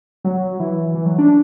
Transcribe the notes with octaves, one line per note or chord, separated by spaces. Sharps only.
F#3
E3
E3
F#3
D4